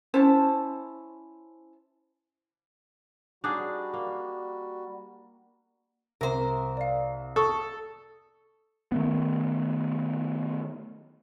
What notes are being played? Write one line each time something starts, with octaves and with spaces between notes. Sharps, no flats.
C#4 E4 C5 A5
G3 D4 D#4 F#4 G#4
A#3
C2 A#4 C5
D5 F5
A4 C#6 D#6 E6
D#3 A3 B3